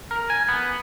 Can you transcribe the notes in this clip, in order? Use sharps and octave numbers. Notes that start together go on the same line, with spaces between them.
A#4
G#5
B3